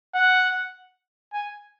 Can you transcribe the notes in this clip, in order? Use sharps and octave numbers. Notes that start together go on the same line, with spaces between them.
F#5
G#5